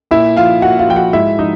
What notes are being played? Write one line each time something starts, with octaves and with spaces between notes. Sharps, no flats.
A#2 E4 E5
F3 F4 F5
A#2 F#4 F#5
F4 F5
F3 G5
F#4 F#5
G#2 E4 E5
F3 D#4 D#5